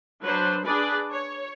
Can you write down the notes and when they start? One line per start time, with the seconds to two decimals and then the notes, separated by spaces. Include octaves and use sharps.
0.21 F#3 D4 B4 C5
0.65 D4 G#4 B4 D5
1.11 C#5